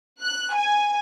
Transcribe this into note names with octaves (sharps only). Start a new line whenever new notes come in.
F#6
G#5